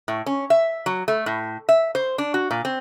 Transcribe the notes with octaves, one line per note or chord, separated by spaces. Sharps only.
A2
C#4
E5
F#3
A3
A2
E5
C5
D4
F#4
A#2
C4